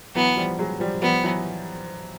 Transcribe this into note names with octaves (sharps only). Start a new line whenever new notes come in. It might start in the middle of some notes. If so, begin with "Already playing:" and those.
E3 F#3 B3
F3 G3
F#3 G#3
F3 G3
F3 G3 B3
E3 F#3